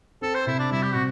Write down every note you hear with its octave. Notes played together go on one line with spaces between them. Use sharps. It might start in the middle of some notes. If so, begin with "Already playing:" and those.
C4 A4
C5
C3 E4
D4
G3 E4
G4
C3 F#4